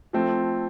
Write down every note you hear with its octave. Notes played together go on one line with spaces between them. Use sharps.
F3 A3 C4